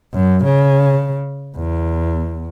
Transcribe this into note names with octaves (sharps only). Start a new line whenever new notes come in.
F#2
C#3
E2